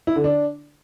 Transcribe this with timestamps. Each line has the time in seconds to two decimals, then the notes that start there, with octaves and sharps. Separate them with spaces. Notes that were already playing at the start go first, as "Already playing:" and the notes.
0.07 E4
0.16 D3
0.24 D4